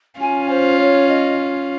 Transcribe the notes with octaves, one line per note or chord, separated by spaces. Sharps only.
C#4 F4 G#5
C5
C#5
D#5